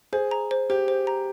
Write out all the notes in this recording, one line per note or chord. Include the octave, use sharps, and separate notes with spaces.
G#4 C5
A#5
C5
G4 C5
C5
A#5